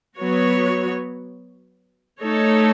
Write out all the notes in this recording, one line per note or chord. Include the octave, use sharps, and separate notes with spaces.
F#3 B3 F#4 C#5
A3 D#4 A4 C#5